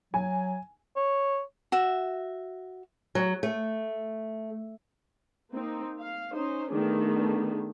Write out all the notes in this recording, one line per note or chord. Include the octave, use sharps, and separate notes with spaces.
F#3 G#5
C#5
F#4 E5
F#3
A3
A#3 C4 D#4
F5
C#4 D#4 C5
D3 D#3 A3 B3 D4 G#4